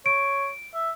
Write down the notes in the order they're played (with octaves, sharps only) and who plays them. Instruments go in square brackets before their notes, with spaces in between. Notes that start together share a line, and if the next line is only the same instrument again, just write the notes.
[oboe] C#5 [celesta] D7
[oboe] E5